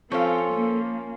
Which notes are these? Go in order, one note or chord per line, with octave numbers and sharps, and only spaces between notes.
F3 C4 C#4 F4 A4
A#3